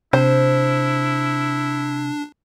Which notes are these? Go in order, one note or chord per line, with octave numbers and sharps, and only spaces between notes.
C3 D4 E4 C5